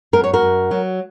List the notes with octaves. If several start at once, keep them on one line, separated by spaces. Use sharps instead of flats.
F#2 A#4
C#5
F#4 A#4
F#2
F#3